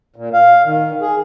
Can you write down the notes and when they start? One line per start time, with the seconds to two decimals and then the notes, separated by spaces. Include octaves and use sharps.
0.16 A#2
0.33 F5
0.65 D#3
1.01 G#4